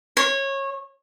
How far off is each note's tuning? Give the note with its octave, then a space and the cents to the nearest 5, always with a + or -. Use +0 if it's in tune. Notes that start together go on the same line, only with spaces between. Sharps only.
C#5 -20